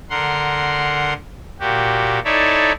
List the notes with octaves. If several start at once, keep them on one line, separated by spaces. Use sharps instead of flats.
D3 A#4 F#5 C6
A#2 F#4 G4
D#4 E4 A4 C#5 D5 E5